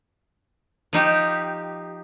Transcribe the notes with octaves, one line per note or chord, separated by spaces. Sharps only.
F3 D#4 G4